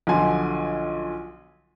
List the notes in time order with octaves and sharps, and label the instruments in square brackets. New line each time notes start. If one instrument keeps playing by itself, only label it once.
[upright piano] B1 D3 F3 G#5 C6